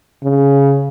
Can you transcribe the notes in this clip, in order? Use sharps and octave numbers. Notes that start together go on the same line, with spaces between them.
C#3